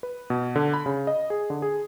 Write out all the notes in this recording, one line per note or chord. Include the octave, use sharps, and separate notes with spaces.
B4
B2
D3
B5
C#3
D#5
G#4
D3
G#4